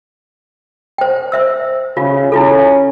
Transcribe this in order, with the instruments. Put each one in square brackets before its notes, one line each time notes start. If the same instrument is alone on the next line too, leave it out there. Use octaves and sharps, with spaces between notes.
[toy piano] C5 G5
C5 E5 E6
[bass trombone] C#3 [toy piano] F4
[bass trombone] C#4 [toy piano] E4 F4 A4